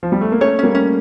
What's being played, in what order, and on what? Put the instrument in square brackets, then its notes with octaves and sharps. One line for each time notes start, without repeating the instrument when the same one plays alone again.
[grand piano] F3
G3
A3
A#3
[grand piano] A3 C#4 [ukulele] C#5
[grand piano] G3 A#3 [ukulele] C#4
[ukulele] C#4